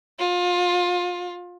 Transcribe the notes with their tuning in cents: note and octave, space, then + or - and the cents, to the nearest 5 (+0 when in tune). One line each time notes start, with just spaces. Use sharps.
F4 +25